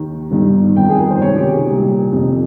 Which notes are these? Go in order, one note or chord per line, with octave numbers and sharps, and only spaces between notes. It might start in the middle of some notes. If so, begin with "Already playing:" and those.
Already playing: D#2 D#3
G1 G2 D#3
G1 F2 D#3 G5
G#4
A#4
C5
C#2 C3 D#3 C#5
G4
G#4
C2 A#2 G4
F1 F2 C3 D#3